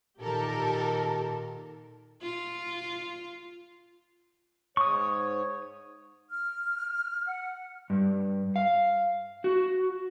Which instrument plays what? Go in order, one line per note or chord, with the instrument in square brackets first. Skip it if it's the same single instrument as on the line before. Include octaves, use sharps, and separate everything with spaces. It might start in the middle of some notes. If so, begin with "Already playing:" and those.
[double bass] A#2 D#3 [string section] G4 A4 A#4
[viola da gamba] F4
[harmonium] G#2 C#5 [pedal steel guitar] C#6 D#6
[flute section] F6
F#5
[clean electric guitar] G2
F5
F#4